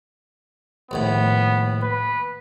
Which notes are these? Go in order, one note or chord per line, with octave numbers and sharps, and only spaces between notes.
A#1 D#2 A2 B3
B4